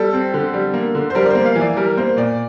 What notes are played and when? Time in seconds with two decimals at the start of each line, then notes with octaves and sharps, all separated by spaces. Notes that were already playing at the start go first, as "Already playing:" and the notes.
Already playing: G3 A4
0.13 C4
0.34 D3
0.54 G3
0.74 A#3
0.95 D3
1.10 C5
1.15 G3 A#4
1.26 D5
1.30 A#3 C5
1.45 F5
1.56 E3
1.61 D5
1.77 G3 A#4
1.97 A#3 C5
2.17 A#2 D5